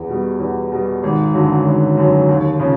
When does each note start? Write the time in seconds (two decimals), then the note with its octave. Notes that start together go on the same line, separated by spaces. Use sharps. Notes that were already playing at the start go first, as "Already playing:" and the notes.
Already playing: E2
0.09 B2 G3
0.39 E2
0.72 B2 G3
1.03 G#1
1.34 F#2 D3 F#3
1.66 G#1
1.97 F#2 D3 F#3
2.29 D#2
2.59 C#3 F3